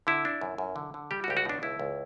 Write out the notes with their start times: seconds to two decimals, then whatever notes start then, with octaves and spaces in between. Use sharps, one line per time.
0.07 D3 E4
0.25 D4
0.41 F#2
0.58 F#2
0.76 D3
0.94 D3
1.11 G3 G4
1.24 F#4
1.28 C#2 G4
1.37 F#4
1.45 B2 D4
1.62 C#2 E4
1.79 C#2